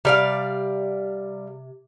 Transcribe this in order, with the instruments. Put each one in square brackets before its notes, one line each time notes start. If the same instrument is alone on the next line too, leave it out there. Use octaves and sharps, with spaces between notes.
[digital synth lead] C3 [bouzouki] G3 D5 F5